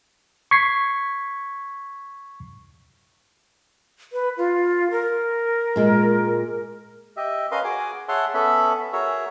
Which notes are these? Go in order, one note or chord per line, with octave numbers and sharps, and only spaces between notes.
C#6 G#6 B6 C7
B4
F4
A#4
A#2 G#3
G4 D#5 E5
C#4 A#4 B4 D#5 F5 C6
F#4 G#4 G#5 D6
G#4 C#5 E5 F#5 A5 C6
B3 C#4 A4 E5 B5
F#4 G#4 A#4 C#5 E5